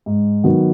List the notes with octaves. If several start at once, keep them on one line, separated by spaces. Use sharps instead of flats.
G#2
D#3 F#3 B3